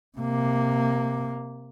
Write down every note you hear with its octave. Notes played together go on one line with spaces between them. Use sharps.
C3 A#3